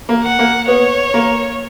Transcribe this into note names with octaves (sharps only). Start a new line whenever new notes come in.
A#3
F#5
A#3
B3 C#5
A#3